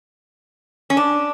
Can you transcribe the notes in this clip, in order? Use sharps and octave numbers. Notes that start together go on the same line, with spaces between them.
C#4
D4